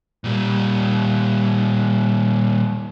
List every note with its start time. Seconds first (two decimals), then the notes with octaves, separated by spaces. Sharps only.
0.24 A#2 G3